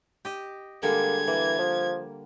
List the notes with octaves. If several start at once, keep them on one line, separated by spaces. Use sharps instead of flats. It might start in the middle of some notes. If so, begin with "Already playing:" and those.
G4 D#5
D3 G3 G#3 A#3 G#6
E3 A#3
F3